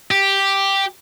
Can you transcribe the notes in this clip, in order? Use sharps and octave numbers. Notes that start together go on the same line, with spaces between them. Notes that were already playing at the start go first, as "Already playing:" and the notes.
G4